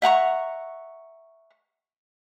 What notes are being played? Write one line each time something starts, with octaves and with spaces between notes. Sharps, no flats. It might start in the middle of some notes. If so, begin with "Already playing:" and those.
E5 F#5 A#5 C#6